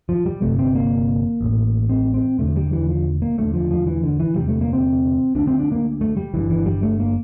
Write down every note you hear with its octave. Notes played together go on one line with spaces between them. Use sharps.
F3
G3
G1 F2 C3 A3
C4
A#3
A1 A2
C4
C4
E1 D2 D3 A3
G3
E3
F3
A#3
E1 D2 D3 A3
F3
F3
E3
D3
E3
E1 D2 C3 G3
A3
A#3
C4
D2 D3 D4
C4
D4
A#3
A3
G3
G1 G2 D3 E3
E3
G3
A3
A#3